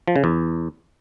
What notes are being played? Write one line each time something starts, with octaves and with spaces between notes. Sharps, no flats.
F3
C#3
E2